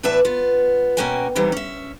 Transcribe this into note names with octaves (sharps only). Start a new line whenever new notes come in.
E2 A2 B4 D5 E5 A5
B3 F4
B2 A#3 C#4 F#4 G5 G#5
C3 D#3 E3 G3 A#3
C#4 E5